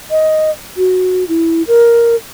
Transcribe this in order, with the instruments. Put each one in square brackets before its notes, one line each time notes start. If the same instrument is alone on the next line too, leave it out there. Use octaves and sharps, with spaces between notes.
[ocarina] D#5
F#4
E4
A#4